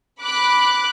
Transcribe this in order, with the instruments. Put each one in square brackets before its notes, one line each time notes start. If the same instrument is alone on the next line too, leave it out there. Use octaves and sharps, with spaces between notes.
[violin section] B5 D6 F#6